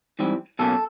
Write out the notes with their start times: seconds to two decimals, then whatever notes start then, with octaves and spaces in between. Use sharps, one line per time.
0.19 G#2 E3 G3 C4
0.59 B2 F#3 A#3 C#4 A4